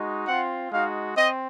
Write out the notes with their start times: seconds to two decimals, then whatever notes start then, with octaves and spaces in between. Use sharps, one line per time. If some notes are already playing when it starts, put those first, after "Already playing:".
Already playing: G#3 D#4 F#4
0.28 C4 F4 F#5
0.72 G#3 D#4 F#4 F5
1.17 C4 D#5